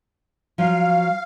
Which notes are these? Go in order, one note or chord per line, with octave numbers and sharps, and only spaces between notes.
F3 F#3 F5